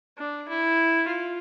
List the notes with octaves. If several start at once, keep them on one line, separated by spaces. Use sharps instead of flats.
D4
E4
F4